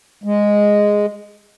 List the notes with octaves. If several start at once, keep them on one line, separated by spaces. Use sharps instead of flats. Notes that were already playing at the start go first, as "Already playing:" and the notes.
G#3